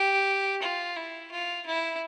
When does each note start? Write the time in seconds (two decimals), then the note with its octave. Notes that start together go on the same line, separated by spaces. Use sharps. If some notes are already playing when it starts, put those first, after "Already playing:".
Already playing: G4
0.62 F4
0.96 E4
1.31 F4
1.66 E4